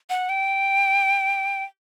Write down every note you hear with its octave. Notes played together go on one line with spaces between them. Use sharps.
F#5
G5